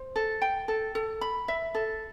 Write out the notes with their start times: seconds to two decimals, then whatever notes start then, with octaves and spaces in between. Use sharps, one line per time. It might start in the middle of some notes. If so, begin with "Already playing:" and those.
Already playing: C5
0.16 A4
0.42 G5
0.68 A4
0.95 A4
1.21 B5
1.48 E5
1.75 A4